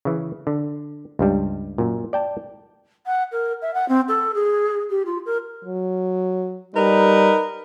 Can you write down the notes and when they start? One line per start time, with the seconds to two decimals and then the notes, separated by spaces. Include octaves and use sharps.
0.05 C#3 E3
0.47 D3
1.19 C#2 G2 G3
1.78 F#2 A#2
2.13 D5 G5 A5
3.06 F#5
3.32 A#4
3.61 E5
3.74 F#5
3.88 C4
4.08 A4
4.34 G#4
4.90 G4
5.05 F4
5.25 A#4
5.65 F#3
6.75 G3 D#4 A#4 B4